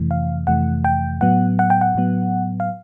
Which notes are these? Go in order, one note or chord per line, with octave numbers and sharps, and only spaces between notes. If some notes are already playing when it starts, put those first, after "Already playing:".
Already playing: F2 C3 E3 A3
F5
F2 C3 E3 A3 F#5
G5
A2 F#3 B3 F#5
F#5
G5
F#5
A2 F#3 B3
F5